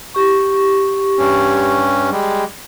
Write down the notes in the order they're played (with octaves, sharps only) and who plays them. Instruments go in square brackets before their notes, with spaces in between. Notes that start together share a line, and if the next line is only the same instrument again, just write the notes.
[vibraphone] G4 C#6
[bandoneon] G2 C#4
G3 G#3